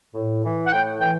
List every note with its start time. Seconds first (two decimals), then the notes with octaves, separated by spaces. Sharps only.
0.14 A2
0.43 E3
0.67 F#5
0.72 A2 G5
1.00 E3 G5